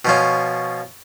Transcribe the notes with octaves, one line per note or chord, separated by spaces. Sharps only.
B2 F3 C#4